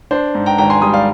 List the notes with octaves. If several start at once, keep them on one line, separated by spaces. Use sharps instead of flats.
D4 C5
G#2
G5 A#5
G#1 G5 A#5
G#5 C6
G3 C6 D#6
D5 F5